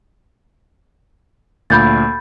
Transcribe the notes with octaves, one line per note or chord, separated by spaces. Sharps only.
D2 A#2 B5 G6 A6